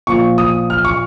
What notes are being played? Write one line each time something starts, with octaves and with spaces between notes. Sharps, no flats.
A#2 F3 C#6
D#6
F6
C#6